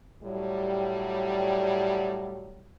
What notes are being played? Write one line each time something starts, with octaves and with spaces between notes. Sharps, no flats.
A2 F#3 G3